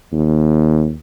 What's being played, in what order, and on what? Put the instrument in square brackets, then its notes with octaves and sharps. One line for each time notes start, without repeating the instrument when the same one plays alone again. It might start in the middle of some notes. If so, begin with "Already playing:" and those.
[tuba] D#2